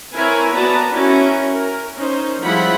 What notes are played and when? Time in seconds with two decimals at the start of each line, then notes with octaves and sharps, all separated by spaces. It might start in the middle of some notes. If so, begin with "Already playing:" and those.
0.15 C4 E4 A#4 B4 C#5 G#5
0.53 B3 F#4 B4 D5 A5 A#5
0.92 C#4 E4 F#4 A#4
1.52 A#4
1.95 C#4 D#4 C5
2.42 F3 G3 G#3 E4 F#5 B5